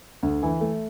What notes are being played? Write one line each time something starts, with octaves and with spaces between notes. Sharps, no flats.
D2
E3
A3